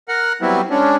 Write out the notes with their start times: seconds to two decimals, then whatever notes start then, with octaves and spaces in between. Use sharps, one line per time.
0.09 A#4 F#5
0.41 F#3 G3 B3 C4 E4
0.70 G#3 C#4 D4